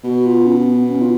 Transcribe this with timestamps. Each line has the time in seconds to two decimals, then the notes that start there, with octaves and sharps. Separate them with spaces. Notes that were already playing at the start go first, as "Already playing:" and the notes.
0.04 B2 F#4
0.26 F4
0.46 C#4
0.68 B3
0.89 C#4
1.01 F4